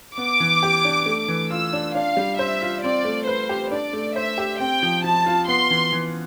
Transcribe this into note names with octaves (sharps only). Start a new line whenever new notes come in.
B3 D6
E3
G4
D4
A3
E3
F4 E6
D4
D4 F5
G3
C5 E5
F4
C4 D5
A3
B4 C5
G4
D4 D5
A3
C5 E5
G4
C4 G5
F3
F3 A5
F4
B3 C6
E3
E3